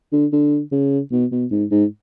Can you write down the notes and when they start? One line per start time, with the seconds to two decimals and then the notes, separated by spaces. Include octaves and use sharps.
0.12 D3
0.33 D3
0.72 C#3
1.12 B2
1.32 B2
1.51 G#2
1.71 G#2